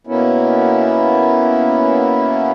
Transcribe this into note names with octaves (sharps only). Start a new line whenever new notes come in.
B2 A#3 B3 C#4 E4